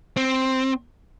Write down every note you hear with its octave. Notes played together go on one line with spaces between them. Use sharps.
C4